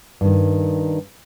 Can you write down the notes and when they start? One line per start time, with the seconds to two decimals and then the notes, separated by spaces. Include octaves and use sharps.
0.21 G2 D#3